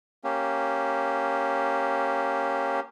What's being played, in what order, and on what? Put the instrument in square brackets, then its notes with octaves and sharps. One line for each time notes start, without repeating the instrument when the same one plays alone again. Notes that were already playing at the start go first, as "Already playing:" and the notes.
[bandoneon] A#3 C#4 G4